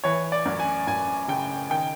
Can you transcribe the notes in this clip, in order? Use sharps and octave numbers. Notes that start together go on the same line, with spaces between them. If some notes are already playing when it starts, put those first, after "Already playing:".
E3 C#5
D5
F#2
G#5
F#2 G#5
C#3 G5
D#3 G5